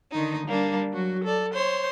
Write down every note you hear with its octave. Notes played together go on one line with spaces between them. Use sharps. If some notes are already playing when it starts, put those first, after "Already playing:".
D3 D#3 D#4
G3 A#3 D4
F#3 F#4
A4 D5
C5 C#5 C6